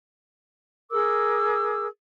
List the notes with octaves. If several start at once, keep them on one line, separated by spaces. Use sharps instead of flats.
G#4 A#4 D6 E6